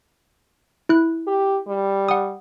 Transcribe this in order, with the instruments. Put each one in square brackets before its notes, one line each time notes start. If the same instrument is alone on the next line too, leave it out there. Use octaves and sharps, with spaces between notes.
[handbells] E4 F#6
[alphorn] G4
G3
[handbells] F#5 D#6